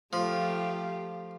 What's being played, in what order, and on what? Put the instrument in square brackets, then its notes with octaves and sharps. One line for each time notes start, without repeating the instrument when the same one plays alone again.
[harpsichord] F3 [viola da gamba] A3 F4 G4